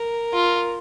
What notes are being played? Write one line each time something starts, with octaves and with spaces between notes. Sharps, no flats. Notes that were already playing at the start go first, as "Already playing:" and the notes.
Already playing: A#4
F4